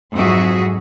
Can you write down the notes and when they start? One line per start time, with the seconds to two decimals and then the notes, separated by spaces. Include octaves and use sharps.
0.14 F2 G#2 F#3 F#4 G#4 E5